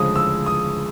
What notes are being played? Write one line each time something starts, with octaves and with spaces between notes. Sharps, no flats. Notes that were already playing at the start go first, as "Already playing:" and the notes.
Already playing: D2 C#3 F3 G#3 D#6
E6
D#6